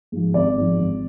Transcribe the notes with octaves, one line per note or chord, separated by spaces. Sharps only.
G#2 F3
G#1 D5
G#2 F3
G#1